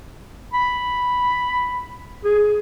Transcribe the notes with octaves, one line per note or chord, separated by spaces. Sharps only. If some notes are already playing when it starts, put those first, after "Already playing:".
B5
G#4